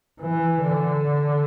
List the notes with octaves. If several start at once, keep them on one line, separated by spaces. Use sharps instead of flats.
E3
D3